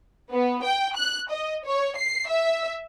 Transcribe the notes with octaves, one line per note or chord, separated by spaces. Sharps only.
B3
G5
F#6
D#5
C#5
C7
E5